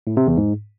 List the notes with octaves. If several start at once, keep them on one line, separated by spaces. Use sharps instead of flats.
A2
C3
E2
G#2